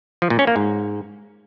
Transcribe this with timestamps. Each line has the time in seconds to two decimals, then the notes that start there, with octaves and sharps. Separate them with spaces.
0.22 F3
0.30 A#2
0.39 C#4
0.47 A#3
0.56 G#2